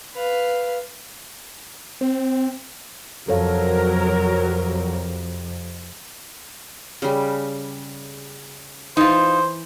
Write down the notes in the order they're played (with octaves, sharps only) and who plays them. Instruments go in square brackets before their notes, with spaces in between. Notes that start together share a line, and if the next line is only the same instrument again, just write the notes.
[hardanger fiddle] B4 F5
[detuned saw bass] C4
[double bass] F2 C3 [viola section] F#3 A#4 [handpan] A4 C#5 F5
[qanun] C#3 G3
[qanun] E3 [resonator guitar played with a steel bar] D#4 F4 [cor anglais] C5